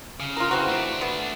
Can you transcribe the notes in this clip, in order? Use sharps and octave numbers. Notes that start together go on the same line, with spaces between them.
C#3
F4 A#4
E3 C4 F#4
A3 D4
B3